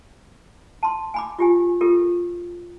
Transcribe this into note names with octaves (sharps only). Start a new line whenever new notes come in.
A5 C6
G#5 B5 D6
F4 G4 G#5
F4 G4 A4 A#4